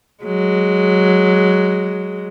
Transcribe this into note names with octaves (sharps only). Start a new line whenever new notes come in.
F#3 G#3